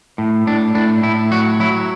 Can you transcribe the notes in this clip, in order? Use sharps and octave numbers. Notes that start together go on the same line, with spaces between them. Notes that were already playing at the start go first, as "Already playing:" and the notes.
A2
A2 D4
A2 D4
A2 E4
F#3 F#4
F#3 E4